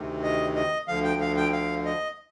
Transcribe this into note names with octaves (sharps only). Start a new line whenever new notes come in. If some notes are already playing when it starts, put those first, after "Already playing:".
Already playing: D2 C3 D#3
D#5
D#5
D2 D3 F3 F5
G5
F5
G5
F5
D#5